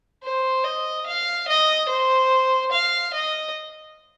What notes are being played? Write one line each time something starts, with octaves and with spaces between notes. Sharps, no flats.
C5
D#5
F5
D#5
C5
F5
D#5